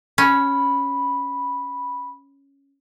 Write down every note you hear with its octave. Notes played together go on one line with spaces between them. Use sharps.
C#4 B5